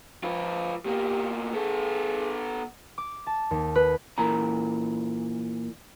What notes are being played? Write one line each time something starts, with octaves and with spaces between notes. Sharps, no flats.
F3 F4 B4
B2 A#3 G4
B3 G#4 A4
D6
A5
D#2
B4
A#2 E3 A#5